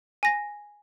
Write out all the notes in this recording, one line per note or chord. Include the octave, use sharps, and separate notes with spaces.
G#5 A#6